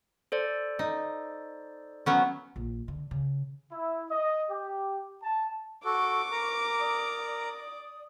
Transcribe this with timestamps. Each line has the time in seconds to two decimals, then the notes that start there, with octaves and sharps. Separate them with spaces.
0.32 A4 C5 D5
0.79 D#4
2.06 F#3 B3 C#4
2.56 A#1
2.88 D3
3.11 C#3
3.72 E4
4.10 D#5
4.51 G4
5.23 A5
5.85 F#4 A4 C#6 D6
6.32 A#4 A#5
6.80 D5 D#6